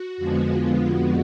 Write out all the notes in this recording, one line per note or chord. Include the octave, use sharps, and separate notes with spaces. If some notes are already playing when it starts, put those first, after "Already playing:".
Already playing: F#4
F2 D3 F3 G#3 B3
F4
F#4